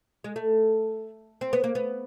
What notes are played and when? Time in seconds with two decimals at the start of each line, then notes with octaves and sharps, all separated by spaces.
0.24 G#3
0.36 A3
1.41 C4
1.53 B3
1.64 A#3
1.75 B3